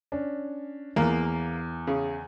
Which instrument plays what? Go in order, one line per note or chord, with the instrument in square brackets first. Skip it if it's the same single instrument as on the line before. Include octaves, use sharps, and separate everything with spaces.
[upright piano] C#4 D4
[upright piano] E2 [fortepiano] A#3
[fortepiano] C#3